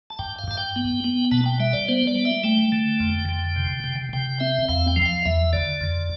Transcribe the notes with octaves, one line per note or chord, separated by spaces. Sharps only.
A5
G2 G5
F5
G2 A5
G5
B3
B3
B2 A5
G5
G3 E5
D5
B3 C5
D5
G3
E5
A3 G5
D3
F2
D3
C3
C3
C3 G5
C4 E5
E2 F5
G5
F3
G5
F5
E2 E5
D3 D5
F2